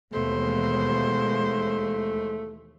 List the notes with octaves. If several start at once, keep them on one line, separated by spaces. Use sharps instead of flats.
D#2 B2 E3 G#3 A3 C5